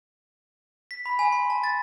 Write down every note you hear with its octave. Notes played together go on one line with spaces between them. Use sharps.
B6
B5
G#5
C6
A5
A6